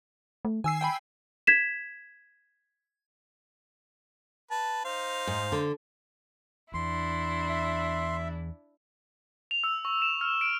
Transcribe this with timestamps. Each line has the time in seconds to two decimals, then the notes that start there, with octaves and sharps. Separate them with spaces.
0.45 A3
0.64 D#3 G#5 E6 C7
0.81 G5 G#5 B5
1.47 G#6 B6 E7
4.51 B4 A5
4.84 D#4 C5 F5
5.27 G#2
5.52 D3
6.74 E2 D4 E4 C6
7.49 E5
9.51 F7
9.64 E6
9.85 C#6
10.02 E7
10.21 F6
10.41 D7